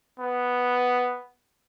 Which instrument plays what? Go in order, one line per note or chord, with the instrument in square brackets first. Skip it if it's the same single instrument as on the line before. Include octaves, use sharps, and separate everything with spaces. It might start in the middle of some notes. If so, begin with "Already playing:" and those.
[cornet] B3